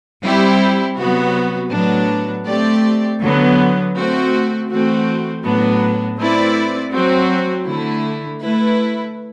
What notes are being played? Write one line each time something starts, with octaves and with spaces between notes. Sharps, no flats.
G3 C4 E4 G4
C3 F#3 B3 F#4
A2 F#3 B3 D4
A3 C4 G4 D5
D3 F#3 B3
A3 C4 F#4
E3 A3 C4 F#4
A2 F#3 B3 D4
A3 C4 E4 B4 D5
F#3 C4 F#4
D3 A3 E4
A3 E4 B4